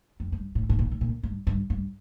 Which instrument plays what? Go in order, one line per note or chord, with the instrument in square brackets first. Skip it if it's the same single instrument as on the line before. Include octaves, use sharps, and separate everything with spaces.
[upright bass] F2
G2
A2
A2
A#2
A2
A#2
G2
G2
G2